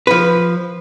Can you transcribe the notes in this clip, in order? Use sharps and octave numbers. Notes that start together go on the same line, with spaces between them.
F3 B4